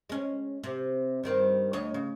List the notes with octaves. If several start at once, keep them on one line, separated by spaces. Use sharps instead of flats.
G#3 C#4
C3
G2 D#3 C4
D2 C#5 D#5
C#3